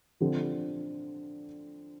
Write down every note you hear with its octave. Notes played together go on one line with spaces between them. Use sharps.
D3 F3 C4